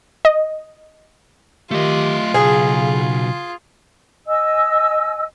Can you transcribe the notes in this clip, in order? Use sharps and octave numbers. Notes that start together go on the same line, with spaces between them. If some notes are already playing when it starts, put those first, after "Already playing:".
D#5
D#3 A3 F4 G4 D#5
B1 C#3 G#4
D#5 G#5 E6